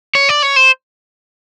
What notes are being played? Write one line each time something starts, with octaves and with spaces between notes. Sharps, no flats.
C#5
D5
C#5
C5